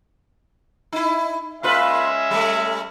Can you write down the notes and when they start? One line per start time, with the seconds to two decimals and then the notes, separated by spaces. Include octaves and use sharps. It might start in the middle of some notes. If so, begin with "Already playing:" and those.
0.93 D#4 E4
1.63 G#3 A#3 C#4 F4 B4 E5
2.31 G3 A3